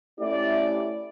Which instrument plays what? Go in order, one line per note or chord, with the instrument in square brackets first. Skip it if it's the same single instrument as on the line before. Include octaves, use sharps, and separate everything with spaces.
[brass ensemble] A3 C#4 E4 G4 D5